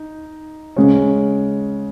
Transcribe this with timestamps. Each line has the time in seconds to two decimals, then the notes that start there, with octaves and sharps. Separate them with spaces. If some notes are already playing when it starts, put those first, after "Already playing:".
Already playing: D#4
0.76 C#3 G#3 C#4